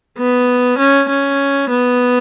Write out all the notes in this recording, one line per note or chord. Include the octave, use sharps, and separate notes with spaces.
B3
C#4
C#4
B3